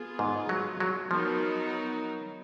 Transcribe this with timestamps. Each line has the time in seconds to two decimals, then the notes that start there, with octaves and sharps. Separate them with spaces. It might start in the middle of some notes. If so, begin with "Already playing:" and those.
Already playing: B3 F4 G#4
0.19 G#2
0.49 F#3
0.80 F#3
1.10 F3 F#3 B3 D#4 F#4 A#4